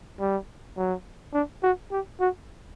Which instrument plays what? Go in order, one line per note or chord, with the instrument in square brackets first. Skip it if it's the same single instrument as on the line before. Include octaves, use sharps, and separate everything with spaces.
[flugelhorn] G3
F#3
D4
F#4
G4
F#4